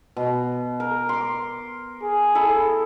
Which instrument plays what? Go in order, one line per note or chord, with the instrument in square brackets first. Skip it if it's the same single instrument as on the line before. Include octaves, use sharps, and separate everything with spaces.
[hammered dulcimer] B2
A#4
C6 D6
[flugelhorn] G#4
[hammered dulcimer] E4 A4